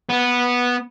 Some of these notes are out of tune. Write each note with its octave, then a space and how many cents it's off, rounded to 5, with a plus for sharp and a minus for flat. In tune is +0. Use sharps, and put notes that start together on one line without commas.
B3 -10